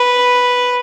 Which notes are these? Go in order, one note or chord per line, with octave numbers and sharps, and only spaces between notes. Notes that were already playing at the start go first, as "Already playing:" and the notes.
Already playing: B4